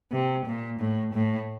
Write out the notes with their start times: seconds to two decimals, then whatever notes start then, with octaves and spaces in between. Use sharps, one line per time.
0.12 C3
0.46 A#2
0.79 A2
1.13 A2